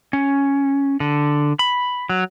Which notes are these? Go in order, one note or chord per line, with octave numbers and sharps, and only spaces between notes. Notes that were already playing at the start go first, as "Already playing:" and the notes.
C#4
D3
B5
F#3